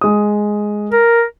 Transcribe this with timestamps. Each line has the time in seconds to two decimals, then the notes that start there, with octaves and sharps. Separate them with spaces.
0.01 G#3 D#6
0.92 A#4